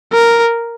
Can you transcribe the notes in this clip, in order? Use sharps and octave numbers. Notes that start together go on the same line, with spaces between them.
A#4